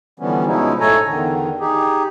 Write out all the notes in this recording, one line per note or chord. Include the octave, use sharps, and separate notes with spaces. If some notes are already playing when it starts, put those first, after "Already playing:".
D3 E3 F3 G3 B3 C#4
B2 F3 G#3 C#4 D#4 E4
A2 A3 A4 C#5 G#5 A#5
E2 D3 D#3
D#4 G4 G#4